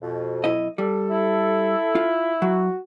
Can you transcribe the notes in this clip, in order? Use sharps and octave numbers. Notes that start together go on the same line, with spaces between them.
F2 B2
B1 E4 D#5
G3 A4
E4
F4
F#3 F#4